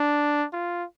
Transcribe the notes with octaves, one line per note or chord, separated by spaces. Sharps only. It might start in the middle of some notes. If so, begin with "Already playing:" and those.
Already playing: D4
F4